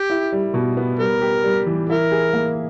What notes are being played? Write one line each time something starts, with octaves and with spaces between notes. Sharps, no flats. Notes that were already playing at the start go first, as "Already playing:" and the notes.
Already playing: G4
E4
G3
B2
B3
G3 A#4
G4
G3
E3
E4 A#4
G#4
A#3